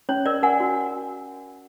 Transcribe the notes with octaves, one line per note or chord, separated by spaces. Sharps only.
C#4 C#5
A#4 D5
A#4 F#5 G#5
F#4